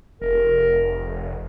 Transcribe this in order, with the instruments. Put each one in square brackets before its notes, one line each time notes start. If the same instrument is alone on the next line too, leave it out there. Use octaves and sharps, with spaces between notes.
[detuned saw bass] F1 [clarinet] A#4